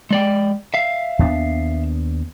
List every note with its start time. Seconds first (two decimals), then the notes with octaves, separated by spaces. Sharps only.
0.11 G#3 D5 G5
0.74 E5 F5
1.19 D#2 B3 D4